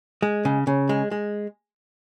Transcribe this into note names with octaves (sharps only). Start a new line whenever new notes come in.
G#3
C#3
C#3
G#3
G#3